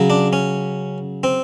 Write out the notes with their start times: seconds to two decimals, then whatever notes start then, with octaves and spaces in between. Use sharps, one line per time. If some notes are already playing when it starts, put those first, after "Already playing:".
Already playing: C#3 F#3
0.10 D4
0.33 C#4
1.23 C4